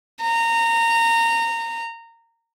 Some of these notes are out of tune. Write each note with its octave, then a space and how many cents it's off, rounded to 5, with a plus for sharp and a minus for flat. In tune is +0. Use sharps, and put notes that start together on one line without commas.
A#5 -20